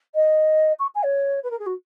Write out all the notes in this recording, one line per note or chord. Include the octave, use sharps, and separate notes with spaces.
D#5
C#6
G#5
C#5
B4
A#4
G#4
F#4